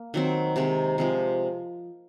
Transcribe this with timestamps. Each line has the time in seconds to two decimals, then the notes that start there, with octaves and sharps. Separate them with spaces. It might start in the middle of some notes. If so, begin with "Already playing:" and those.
Already playing: A#3
0.14 D#3 F#3 C4
0.56 C3 D#3 G#3
0.98 C3 F3 G#3